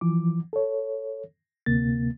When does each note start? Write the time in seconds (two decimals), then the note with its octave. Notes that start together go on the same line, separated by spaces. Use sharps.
0.01 E3 F3 D6
0.53 A4 C#5
1.66 D2 C3 A#3 A6